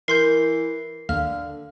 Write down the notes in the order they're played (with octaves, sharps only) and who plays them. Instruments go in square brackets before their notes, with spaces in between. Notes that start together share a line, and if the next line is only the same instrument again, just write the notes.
[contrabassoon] E3 [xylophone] A#4 C6 G6 [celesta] C7
[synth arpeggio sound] D#2 [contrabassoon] D3 [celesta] F5 [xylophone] F6